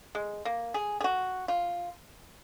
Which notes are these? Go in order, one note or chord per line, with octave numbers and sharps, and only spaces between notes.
G#3
A#3
G#4
G#4
F#4
F4